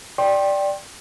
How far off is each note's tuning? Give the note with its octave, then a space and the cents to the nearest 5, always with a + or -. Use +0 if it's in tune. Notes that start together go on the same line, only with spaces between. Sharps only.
D5 +0 G5 +0 C6 +30